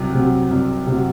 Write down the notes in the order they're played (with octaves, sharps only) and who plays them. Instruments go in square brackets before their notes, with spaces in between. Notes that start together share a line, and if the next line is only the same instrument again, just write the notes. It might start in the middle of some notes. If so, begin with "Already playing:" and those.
Already playing: [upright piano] C2 C3 F#3
C3 F#3
C2
C3
F#3